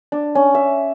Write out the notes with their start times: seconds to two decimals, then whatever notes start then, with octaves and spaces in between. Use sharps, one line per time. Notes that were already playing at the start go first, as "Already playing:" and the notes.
0.12 D4
0.35 C#4
0.55 E5